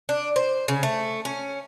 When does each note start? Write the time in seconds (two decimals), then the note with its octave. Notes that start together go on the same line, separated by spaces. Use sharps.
0.09 D4
0.36 C5
0.68 C#3
0.83 A3
1.25 C#4